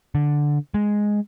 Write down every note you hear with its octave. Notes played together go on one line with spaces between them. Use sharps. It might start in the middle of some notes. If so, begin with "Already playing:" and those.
D3
G#3